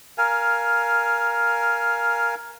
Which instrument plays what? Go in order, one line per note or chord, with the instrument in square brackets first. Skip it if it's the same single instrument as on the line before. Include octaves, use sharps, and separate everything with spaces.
[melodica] A#4 F5 G#5